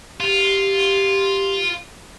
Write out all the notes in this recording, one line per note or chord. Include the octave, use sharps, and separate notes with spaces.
F4 G4